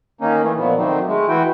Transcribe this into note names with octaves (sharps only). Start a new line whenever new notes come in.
D#3 A#3 C#4 D#4
E3 A3
A#2 F3 F#3 B3
D#3 F#3 A3 C4 D4 D#4
G#3 A3
E3 E4 F#4 G5